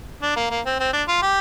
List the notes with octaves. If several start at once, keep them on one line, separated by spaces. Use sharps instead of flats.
D4
A#3
A#3
C4
C4
D4
F4
G4